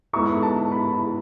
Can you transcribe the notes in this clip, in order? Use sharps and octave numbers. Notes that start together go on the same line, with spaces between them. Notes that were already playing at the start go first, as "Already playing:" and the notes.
G#2 G#3 B3 E4 A4 C#6
A5
B5